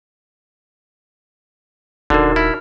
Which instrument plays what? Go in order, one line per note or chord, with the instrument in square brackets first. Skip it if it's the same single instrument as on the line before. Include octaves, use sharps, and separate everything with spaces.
[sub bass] D#1 [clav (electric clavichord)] D3 [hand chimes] D#4 F#4 A#4
[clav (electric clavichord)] E4 [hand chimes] F6